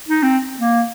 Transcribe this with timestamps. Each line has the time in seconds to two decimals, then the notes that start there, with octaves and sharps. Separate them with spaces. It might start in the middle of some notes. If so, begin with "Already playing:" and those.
0.09 D#4
0.23 C4
0.59 A#3